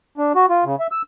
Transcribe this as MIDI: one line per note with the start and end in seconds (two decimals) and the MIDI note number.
0.18 0.33 62
0.35 0.46 66
0.50 0.64 65
0.64 0.76 49
0.80 0.87 76
0.92 1.02 88